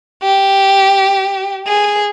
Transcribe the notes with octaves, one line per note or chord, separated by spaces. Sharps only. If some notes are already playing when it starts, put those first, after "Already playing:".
G4
G#4